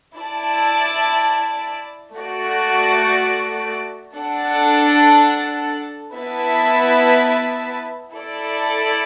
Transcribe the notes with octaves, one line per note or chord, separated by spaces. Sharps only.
E4 D5 A5
A3 F#4 D5
D4 A4 F#5 A5
B3 E4 B4 E5 A5
E4 A4 D5